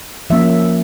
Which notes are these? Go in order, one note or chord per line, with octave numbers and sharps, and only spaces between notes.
F3 A#3 C#4 E5